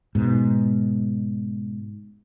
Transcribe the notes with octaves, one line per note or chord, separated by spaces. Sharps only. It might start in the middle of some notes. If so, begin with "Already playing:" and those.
G#2 B2